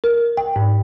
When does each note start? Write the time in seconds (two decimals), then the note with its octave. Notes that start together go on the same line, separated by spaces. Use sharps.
0.04 A#4
0.37 G5
0.56 G#2